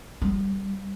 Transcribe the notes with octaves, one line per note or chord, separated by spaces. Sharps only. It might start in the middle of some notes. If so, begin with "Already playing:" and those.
G3